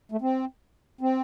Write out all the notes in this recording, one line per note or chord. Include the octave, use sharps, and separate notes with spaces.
A3
C4
C4